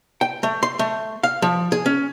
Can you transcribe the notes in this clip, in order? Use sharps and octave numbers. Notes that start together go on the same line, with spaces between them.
G5
A3
C6
A3
F5
F3
G#4
C#4